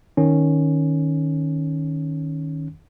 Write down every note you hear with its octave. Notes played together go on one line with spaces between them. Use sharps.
D#3 C#4